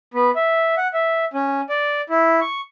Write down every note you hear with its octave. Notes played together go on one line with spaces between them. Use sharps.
B3
E5
F#5
E5
C#4
D5
E4
C#6